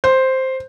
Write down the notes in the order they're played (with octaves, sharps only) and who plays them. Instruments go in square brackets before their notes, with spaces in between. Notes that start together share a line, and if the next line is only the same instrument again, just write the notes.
[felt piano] C5